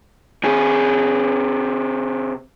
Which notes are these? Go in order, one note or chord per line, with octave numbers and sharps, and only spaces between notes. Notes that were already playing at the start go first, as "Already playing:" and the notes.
C3 G#4